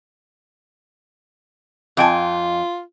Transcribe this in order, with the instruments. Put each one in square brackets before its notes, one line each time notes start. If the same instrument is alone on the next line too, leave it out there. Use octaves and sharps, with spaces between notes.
[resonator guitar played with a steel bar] F2 G5 G#5 [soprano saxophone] F4